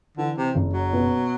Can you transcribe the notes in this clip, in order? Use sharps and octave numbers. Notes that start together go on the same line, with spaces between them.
D3 E3
C3
F#1
F#3
B2